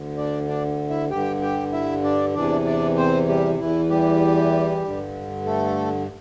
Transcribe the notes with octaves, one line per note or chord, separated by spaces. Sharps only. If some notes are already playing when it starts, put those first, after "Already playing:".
Already playing: D2 D3
D4 D5
D4 D5
E4 E5
G2 D3 G4 G5
G4 G5
E4 E5
D4 D5
E2 C3 E3 D4 D5
D4 D5
C4 C5
G3 G4
E2 E3 E4
G3 G4
G2 D3
A3 A4